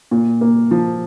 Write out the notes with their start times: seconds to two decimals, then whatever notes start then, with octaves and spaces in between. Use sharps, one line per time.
0.11 A#2
0.41 A#3
0.71 F3